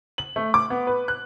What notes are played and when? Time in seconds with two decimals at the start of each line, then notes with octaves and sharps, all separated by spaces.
0.18 F#7
0.36 A3
0.54 D6
0.70 B3
0.87 B4
1.08 F#6